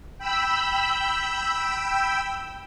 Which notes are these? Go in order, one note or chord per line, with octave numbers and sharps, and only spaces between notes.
G5 B5 E6